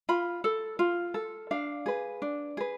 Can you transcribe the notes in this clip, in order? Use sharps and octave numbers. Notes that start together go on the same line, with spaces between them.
F4 B5
A4
F4
A4
D4 F5
G#4 B4
D4
G#4 B4